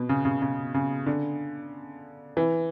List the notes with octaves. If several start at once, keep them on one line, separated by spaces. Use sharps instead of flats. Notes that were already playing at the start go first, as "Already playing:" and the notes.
Already playing: B2
C#3
C#3
C#3
C#3
D3
E3